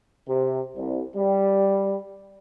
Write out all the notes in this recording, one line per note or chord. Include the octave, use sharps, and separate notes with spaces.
C3
C2
G3